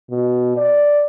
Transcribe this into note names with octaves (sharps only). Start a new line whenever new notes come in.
B2
D5